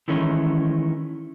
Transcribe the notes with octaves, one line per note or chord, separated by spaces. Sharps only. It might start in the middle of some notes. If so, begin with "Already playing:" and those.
D#3 E3 G#3 A3 C#4